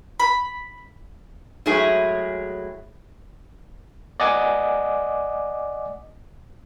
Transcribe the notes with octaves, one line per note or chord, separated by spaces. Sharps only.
B5
A2 F#3 G#3 E4 G#4
D5 D#5 F#5 G#5 D6